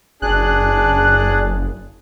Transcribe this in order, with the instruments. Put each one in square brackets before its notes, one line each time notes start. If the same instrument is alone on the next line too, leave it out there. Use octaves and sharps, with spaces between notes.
[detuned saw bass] F#1 [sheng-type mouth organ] D4 G#4 [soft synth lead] F#6